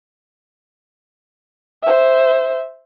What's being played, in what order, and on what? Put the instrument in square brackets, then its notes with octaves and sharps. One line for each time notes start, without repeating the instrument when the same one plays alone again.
[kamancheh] C5 E5